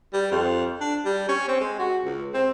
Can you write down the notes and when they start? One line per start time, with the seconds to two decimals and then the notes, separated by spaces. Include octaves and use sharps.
0.13 G3
0.32 F2
0.81 D4
1.05 G3
1.28 C#4
1.48 C4
1.61 G#3
1.79 F#4
2.05 C#2
2.34 C4